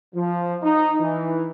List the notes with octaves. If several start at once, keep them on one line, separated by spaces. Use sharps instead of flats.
F3
D#4
E3